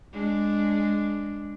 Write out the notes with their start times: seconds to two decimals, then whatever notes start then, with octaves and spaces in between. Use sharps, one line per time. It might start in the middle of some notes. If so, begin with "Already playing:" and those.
0.12 G#3 D4